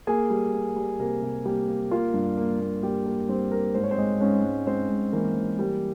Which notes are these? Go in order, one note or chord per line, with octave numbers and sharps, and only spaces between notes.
A#3 G#4 G#5
G3
A#3
G3
C3 A#3 A#4
C3
G3 A#3 G4
A#3
A#3 F4
G2
A#3
A#3
G3 A#3 G4
A#3 A#4
G2 C4 C5
A#3 A#4
G#2 C5
C#5
C4 C5
G#3
G#2 C#4 C#5
G#2
G#3 C4 C5
G#2
E3 A#3 A#4
E3
G3 A#3 G4